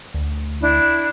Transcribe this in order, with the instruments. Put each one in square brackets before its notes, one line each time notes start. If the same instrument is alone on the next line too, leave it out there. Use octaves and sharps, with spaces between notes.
[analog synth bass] D2
[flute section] D4 E4